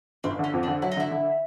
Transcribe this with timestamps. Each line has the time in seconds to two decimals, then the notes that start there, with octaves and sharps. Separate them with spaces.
0.24 G1 C4
0.39 D3 C#4
0.53 F2
0.63 D4
0.68 D3
0.82 F#3 E4
0.92 D#4
0.97 D3 E4
1.11 D3